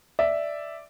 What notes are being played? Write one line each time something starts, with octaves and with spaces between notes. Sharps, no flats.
D5 E5